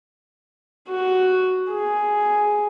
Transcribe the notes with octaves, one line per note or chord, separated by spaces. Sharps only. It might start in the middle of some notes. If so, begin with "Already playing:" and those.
F#4
G#4